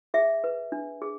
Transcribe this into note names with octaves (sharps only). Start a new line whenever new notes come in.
G#4 E5
B4
D4
G#4